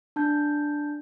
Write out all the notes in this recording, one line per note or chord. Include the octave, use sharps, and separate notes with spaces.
D4 A5 G6